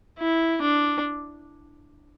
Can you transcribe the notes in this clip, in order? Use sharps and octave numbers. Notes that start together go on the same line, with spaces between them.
E4
D4